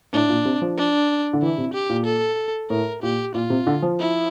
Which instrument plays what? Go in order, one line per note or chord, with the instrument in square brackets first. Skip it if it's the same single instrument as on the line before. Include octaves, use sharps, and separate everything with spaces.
[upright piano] A2 [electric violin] D4
[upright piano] A#2
C3
F3
[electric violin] D4
[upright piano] D3
[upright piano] E3 [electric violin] E4
[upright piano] C3
[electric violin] G4
[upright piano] A#2
[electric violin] A4
[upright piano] A2 [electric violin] A#4
[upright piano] A#2 [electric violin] G4
[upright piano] A#2 [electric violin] F4
[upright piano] C3
D3
F3
[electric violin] E4